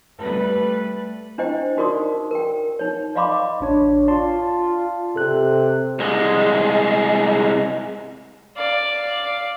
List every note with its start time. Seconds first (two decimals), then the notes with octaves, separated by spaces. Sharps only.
0.20 G3 A3 B4
1.38 D4 E4 C5 D#5 G5
1.77 D#4 F#4 A#4 D5 C6 D#6
2.31 A#4 G5
2.79 D#4 C#5
3.15 D5 D#5 F5 B5 C6 D6
3.60 A1 D4 C#5
4.08 F4 D5 A5 C6
5.16 C3 A4 F#6
5.99 C2 G#3
8.56 D5 F5